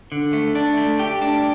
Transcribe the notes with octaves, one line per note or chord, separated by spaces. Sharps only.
D3
A3
D4
A3
G4
D4